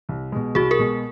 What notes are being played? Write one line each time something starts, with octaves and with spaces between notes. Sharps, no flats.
C2
B2 G#3
C2 F#4 G#4
G#4 A#4
B2 G#3